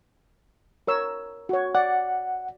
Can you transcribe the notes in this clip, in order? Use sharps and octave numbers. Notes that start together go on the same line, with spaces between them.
A#4 C#5 E6
F#4 C#5
D5 F#5